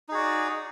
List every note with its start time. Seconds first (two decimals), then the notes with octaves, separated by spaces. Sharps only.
0.09 D#4
0.11 G#4
0.14 F#4
0.17 D5